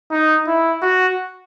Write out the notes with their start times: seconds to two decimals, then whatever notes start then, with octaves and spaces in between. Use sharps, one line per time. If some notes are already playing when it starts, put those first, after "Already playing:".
0.11 D#4
0.47 E4
0.82 F#4